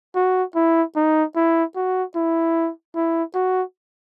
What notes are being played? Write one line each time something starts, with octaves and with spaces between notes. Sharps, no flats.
F#4
E4
D#4
E4
F#4
E4
E4
F#4